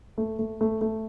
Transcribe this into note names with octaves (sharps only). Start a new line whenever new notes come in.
A3
A3
A3
A3